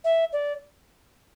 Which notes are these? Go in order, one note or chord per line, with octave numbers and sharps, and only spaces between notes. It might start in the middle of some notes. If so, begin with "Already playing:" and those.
E5
D5